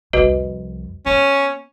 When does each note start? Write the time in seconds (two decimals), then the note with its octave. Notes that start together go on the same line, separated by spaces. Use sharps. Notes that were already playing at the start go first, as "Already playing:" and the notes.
0.13 C2 F2 F#4 B4 D#5
1.06 B3 C#4